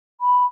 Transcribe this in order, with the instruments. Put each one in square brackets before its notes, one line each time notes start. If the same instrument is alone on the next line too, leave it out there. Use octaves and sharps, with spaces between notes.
[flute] B5